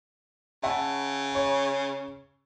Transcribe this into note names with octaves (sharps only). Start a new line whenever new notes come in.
C#3 E5 F#5 A5
C#5